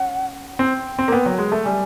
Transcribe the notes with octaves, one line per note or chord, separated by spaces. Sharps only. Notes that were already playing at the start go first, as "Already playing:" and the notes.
Already playing: C#4 F#5
C4 G5 G#5
C4
A#3
B3
F#3
G#3
A3
G3 G#5